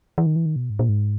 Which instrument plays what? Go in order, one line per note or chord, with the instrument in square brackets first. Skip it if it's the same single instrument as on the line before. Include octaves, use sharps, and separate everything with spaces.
[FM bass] E3
D#3
E3
D#3
B2
G#2
A#2
G#2